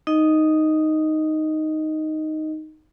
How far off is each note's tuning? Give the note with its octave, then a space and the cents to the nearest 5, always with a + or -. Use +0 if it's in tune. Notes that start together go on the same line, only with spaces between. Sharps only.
D#4 +0 D#5 +0